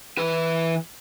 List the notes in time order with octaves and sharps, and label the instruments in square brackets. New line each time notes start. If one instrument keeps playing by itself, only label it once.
[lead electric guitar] E3 B4